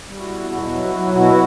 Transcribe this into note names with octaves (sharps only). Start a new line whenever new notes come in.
G3
E4 F#4
E2
B2 E4 F#4
F#3
F#3
B2 E4 F#4